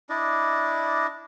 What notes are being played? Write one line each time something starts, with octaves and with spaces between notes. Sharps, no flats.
D4 E4 D5 D#5